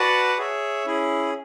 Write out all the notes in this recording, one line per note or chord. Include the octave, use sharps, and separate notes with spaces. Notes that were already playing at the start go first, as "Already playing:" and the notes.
Already playing: F#4 B4 D5 F#5 A5
G#4 C#5 E5
C#4 E4 G#4